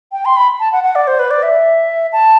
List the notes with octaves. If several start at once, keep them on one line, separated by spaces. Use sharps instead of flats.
G5
C6
B5
A5
F#5
F#5
D5
C5
B4
D5
E5
A5